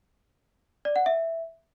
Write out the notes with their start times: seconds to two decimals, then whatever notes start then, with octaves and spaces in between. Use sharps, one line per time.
0.85 D5
0.96 F#5
1.06 E5